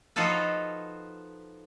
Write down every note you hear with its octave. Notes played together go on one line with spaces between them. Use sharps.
F3 D#4 F4 F#4 A4 B4